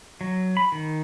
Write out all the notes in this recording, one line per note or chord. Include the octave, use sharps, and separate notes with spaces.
F#3
B5
D#3